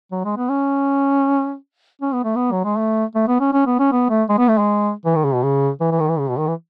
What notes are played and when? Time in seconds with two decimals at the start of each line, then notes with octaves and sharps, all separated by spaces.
0.12 F#3
0.24 G#3
0.37 B3
0.49 C#4
2.02 C#4
2.13 B3
2.24 A3
2.36 B3
2.52 F#3
2.65 G#3
2.78 A3
3.15 A3
3.28 B3
3.40 C#4
3.53 C#4
3.66 B3
3.79 C#4
3.92 B3
4.10 A3
4.29 G#3
4.38 B3
4.48 A3
4.58 G#3
5.06 E3
5.15 D#3
5.25 C#3
5.34 B2
5.43 C#3
5.81 E3
5.91 E3
6.00 D#3
6.09 E3
6.19 C#3
6.29 B2
6.38 D#3
6.47 E3